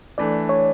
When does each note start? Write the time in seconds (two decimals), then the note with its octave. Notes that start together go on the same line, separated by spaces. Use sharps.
0.18 E3 A3 D4 D5
0.49 C#5